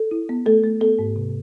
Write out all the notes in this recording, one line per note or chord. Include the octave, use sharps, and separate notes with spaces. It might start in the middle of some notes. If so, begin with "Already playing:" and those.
Already playing: A4
E4
B3
A3 A4
A3
B3 A4
G#2
C3